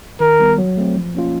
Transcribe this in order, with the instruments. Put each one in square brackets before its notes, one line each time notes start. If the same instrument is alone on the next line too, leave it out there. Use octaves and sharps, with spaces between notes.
[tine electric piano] D#3 [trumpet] A#4
[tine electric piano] G3 B3
F#3
A3 C4
F3
A#3 C#4 F4